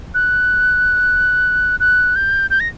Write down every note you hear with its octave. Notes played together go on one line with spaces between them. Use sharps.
F#6
F#6
G6
G6
A#6